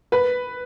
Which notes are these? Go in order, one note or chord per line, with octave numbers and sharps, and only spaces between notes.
B4